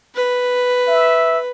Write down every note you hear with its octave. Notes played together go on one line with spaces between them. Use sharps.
B4
E5